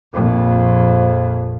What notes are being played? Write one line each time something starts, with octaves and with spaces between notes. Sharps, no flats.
A#1 F2